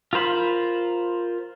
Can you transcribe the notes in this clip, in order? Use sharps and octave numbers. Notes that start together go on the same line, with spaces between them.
F4 A#4 C5 B5